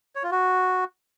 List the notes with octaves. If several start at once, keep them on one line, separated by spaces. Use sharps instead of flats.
C#5
F4
F#4